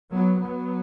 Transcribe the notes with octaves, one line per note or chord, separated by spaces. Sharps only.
F#3 B3
F#3 B3